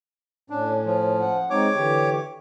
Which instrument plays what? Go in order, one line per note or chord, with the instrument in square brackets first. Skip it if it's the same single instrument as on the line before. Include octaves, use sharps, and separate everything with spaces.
[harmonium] A2 C#4 [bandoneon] D4
[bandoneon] F3
[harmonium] F#5
[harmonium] G#3 C4 D#4 [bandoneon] C#5 D6
[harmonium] D3 E3 G4